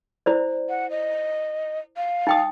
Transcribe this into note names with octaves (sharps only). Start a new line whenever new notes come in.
E4 C5 D5
F#5
D#5
F5
D#4 G5 D#6